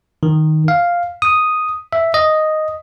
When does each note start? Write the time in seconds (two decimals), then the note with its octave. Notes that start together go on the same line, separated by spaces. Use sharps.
0.23 D#3
0.68 F5
1.22 D#6
1.93 E5
2.14 D#5